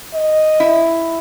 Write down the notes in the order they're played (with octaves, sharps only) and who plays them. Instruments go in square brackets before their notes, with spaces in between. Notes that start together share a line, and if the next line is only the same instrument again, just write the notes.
[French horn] D#5
[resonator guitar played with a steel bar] E4